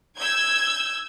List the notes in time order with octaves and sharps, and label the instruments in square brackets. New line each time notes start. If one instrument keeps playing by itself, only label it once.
[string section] E6 G6 G#6